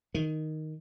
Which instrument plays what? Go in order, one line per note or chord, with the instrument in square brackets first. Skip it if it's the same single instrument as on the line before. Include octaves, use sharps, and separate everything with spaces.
[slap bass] D#3